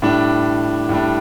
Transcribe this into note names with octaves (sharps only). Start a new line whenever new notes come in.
A2 G3 D4
A2 G3 D4